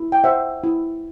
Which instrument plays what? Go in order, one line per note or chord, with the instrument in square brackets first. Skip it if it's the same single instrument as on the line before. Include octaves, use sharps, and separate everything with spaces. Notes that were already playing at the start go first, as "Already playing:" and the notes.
Already playing: [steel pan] E4
G5
C5 E5 F#5
E4